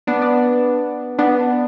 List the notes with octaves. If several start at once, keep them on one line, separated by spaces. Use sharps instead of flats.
B3 D4
B3 D4
B3 D4